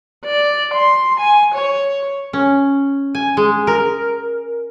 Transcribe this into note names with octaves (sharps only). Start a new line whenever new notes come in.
D5
C6
G#5
C#5
C#4
G#5
G#3
A#4